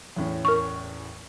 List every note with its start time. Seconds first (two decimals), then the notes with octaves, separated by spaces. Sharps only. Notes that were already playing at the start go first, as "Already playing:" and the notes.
0.16 E2 A2 C#4
0.45 A#4 C#6